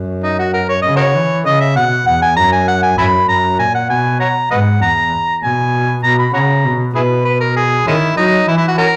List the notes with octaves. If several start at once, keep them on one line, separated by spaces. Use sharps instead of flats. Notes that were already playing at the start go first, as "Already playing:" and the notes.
Already playing: F#2
D#4
F#4
A#4
C#5
C#3 D#5
F#4 A#4 C#5
E3
C#3 D#5
E5
B2 F#5
E2 F#5
G#5
F#2 A#5
G#5
F#5
G#5
F#2 E5 G#5 B5
F#2 A#5
A#2 G#5
F#5
B2 G#5
C#5 F#5 A#5
G#2 B4 D#5 F#5
E2 A#5
B2 G#5
B2 A#5
B5
C#3 C#5 F#5 A#5
B2
B2 E4 G#4 B4
B4
A#4
G#4
D#3 G#3 C#4 E4
F#3 D#4
E3 E4
E4
F#4
C#4 F#4 A#4